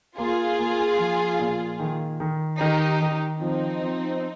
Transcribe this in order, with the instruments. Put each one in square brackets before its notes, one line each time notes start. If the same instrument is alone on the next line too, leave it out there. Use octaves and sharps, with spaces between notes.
[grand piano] A#3 [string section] F4 G#4
[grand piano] A#3
F3
A#2
D#3
D#3
[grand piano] D#3 [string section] D#4 G4
[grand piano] D#3
[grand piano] F3 [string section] C4 D#4
[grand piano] F3